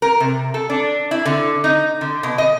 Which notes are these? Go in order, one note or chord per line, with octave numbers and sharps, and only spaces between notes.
A#4
C3
A4
D4
E4
D3
D#4
D3
B2
D#5